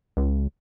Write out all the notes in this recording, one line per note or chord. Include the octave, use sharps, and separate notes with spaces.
C#2